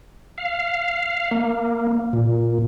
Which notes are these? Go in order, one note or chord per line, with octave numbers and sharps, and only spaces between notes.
F5
A#3
A#2